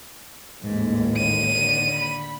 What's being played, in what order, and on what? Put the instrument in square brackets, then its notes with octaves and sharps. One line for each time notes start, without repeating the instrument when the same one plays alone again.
[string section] A1 D#2 [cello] G#2
[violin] D#7
[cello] D3
[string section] B5